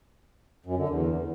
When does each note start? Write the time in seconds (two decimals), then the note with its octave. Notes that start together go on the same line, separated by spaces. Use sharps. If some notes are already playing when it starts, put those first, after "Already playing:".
0.66 F#2
0.77 D3
0.89 E2